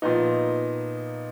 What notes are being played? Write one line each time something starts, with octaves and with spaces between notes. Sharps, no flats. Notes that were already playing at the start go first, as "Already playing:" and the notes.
A#2 F3 B3 D#4